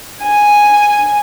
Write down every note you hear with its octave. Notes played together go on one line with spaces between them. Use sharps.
G#5